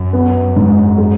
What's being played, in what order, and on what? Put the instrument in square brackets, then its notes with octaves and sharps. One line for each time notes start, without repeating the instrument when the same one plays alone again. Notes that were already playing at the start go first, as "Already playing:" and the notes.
Already playing: [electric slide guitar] F#2
[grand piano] B3
G#2
G#3